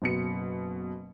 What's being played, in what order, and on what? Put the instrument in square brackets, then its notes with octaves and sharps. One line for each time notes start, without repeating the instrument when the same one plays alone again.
[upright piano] F#1 B2 C#7